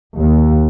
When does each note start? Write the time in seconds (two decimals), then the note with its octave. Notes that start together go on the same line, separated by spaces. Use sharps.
0.16 D#2